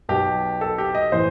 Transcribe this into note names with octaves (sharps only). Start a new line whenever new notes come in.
B1 B2 G4
A4
G4
D#5
A2 E3 C5